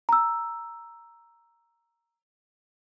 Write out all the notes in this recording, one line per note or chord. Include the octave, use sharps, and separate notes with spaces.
A#5 E6